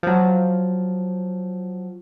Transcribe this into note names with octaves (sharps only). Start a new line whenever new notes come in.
F3 F#3